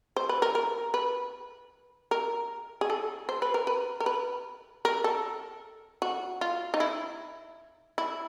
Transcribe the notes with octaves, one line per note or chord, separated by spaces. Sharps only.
C5
B4
A#4
A#4
B4
A#4
G#4
A4
C5
B4
A#4
B4
A#4
B4
A#4
A4
F#4
F4
D#4
E4
E4